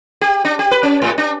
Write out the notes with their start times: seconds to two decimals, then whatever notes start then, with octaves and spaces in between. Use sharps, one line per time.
0.21 G4
0.45 D4
0.59 G4
0.71 B4
0.83 C#4
1.02 G#2
1.18 D4